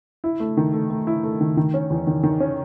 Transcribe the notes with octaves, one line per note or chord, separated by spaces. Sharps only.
E4
A3
D#3
A3
A3
E4
A3
D#3
D#3
C#4
E2
D#3
D#3
C#4